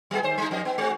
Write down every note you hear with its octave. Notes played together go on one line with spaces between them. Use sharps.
F#3 B3 G#4
D#2 C5
G3 G#3 D#4
F2 D#5
B3
G#3 C4 F#4